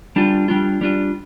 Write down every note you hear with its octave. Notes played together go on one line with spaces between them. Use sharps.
G3 D4 F4
G3 D4 F4
G3 D4 F4